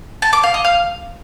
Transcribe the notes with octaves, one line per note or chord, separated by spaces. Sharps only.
A5
D6
F5
D#5
F5